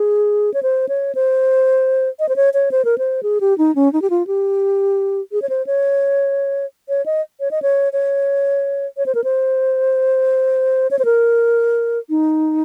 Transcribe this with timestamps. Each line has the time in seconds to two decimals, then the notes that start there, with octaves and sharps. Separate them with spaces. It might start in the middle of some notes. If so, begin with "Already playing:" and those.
Already playing: G#4
0.54 C#5
0.63 C5
0.89 C#5
1.15 C5
2.19 D#5
2.29 C5
2.36 C#5
2.54 C#5
2.71 C5
2.85 A#4
2.98 C5
3.23 G#4
3.41 G4
3.58 D#4
3.75 C#4
3.93 D#4
4.02 G4
4.10 F4
4.27 G4
5.32 G#4
5.42 C#5
5.49 C5
5.67 C#5
6.89 C#5
7.06 D#5
7.40 C#5
7.51 D#5
7.62 C#5
7.93 C#5
8.97 C#5
9.06 C5
9.15 A#4
9.24 C5
10.91 C#5
10.99 C5
11.05 A#4
12.10 D#4